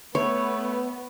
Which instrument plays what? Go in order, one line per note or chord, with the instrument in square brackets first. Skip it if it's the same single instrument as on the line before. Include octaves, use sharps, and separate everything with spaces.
[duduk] A3 [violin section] B3 [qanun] C#5